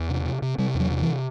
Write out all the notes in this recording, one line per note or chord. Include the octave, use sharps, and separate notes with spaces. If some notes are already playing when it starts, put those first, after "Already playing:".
Already playing: E2
C3
C3
C3
C3 G3
E2
F#3
C3
E3